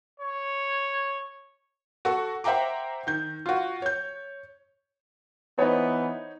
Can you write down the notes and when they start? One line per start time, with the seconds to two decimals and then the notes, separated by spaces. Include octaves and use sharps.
0.20 C#5
2.05 F#4 A4 C#6
2.44 C5 E5 F#5 G5 A#5 D6
3.07 D#3 G6
3.46 F4 F#4
3.82 C#5 G6
5.59 E3 B3 D#4 C5 C#5